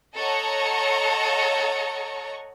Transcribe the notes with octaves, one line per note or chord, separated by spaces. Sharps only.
A4 C#5 D#5 F#5 A#5 C#6